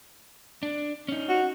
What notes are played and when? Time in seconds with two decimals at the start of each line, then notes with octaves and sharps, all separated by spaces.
0.63 D4
1.08 C#4 D#4
1.29 F#4